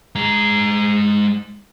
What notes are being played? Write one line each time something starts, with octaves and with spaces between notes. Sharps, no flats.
G#3 A#5